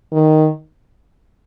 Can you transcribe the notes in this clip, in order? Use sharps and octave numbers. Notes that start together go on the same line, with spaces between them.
D#3